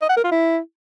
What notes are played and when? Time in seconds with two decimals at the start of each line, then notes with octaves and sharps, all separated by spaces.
0.02 D#5
0.09 F#5
0.17 A#4
0.24 F4
0.31 E4